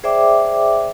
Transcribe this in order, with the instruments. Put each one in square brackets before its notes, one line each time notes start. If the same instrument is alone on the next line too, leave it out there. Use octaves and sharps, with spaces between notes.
[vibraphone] G#4 C5 D5 E5 G5 D6